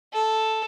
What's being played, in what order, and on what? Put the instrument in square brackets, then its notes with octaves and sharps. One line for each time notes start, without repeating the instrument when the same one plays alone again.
[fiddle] A4